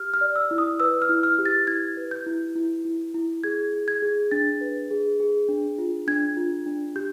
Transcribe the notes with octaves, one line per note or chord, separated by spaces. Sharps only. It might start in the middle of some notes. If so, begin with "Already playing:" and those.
Already playing: G4 F6
F6
D5
E6
E4
D#6
B4 E6
F6
E4
F6
G4
A6
E4 G#6
B4
G6
E4
E4
E4
E4
G#4 G#6
G#4
G#6
G#4
D4 A6
B4
G#4
G#4
D4
F4
D4 G#6
F4
D4
G4 G6